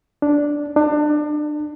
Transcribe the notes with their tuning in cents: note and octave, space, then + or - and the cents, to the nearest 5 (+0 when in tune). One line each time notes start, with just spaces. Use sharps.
D4 -5
D4 +30